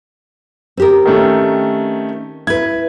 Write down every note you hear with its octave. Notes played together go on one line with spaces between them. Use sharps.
C4 G4 A#4
D#3 A3 C#4
E4 B4 G#6